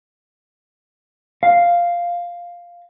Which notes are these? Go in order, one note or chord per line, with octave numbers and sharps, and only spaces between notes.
F5